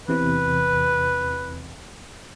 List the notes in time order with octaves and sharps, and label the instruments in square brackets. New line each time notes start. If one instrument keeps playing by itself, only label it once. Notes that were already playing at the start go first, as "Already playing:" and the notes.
[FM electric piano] E2 C3 E3 [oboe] B4